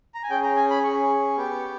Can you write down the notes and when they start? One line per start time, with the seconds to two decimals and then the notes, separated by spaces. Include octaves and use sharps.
0.15 A#5
0.23 G#5
0.30 C#4 G#4 G5
0.43 A#5
0.56 G#5
0.70 B5
0.83 C#4 G#4 C#6
1.37 B3 G4